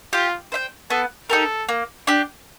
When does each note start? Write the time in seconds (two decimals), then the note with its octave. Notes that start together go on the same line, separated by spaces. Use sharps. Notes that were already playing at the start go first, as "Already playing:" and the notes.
0.13 F4 G4
0.52 C5 E5 G5
0.90 B3 A4
1.30 D#4 G4 A4 A#4
1.69 A#3
2.07 D4 G4